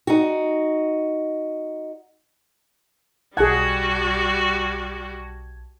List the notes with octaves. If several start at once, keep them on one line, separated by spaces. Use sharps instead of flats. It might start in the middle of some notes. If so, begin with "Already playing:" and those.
D#4 F#4
B1 G3 F#4 G#4 F#5 A5 G#6